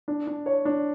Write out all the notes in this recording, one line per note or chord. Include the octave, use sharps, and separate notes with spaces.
D4
D4
C#5
D4